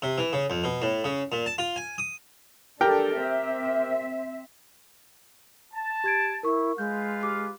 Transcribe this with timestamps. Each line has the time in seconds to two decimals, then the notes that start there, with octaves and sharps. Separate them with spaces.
0.02 C3
0.18 E3
0.33 C#3
0.50 F2
0.64 B2
0.82 A2
1.04 C#3
1.32 A#2
1.46 A5
1.58 F4
1.76 G#5
1.98 D#6
2.81 D4 G4 A4 A#4 G5
3.20 C4 E5
5.74 A5
6.04 G4 G#6 D7
6.43 E4 A#4 C#6
6.78 G#3 F4 B4 F5 G6
7.23 G4 D6